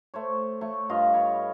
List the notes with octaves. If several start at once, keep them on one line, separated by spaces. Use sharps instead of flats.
A3 C5 C#5
A3 C#5 C#6
G2 F4 D#5 F5
C#5 B5